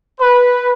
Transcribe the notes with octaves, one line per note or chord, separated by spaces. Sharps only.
B4